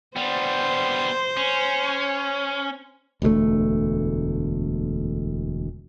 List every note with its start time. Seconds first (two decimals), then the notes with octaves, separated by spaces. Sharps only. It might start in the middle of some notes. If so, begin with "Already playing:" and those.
0.16 G3 B3 C5
1.37 C#4
3.22 E1 D2 G3 A3